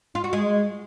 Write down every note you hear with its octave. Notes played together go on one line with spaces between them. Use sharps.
F4
F#4
G#3